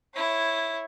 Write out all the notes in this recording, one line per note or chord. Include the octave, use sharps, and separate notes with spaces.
E4 C#5